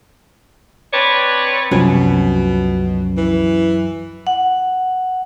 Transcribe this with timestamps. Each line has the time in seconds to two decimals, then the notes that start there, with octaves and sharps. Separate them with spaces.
0.93 C4 D4 B4 C#5
1.71 C2 F#2 B2 F3 C#4
3.17 E3
4.27 F#5